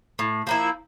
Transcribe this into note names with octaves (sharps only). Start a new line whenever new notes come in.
A2
F3 A#3 E4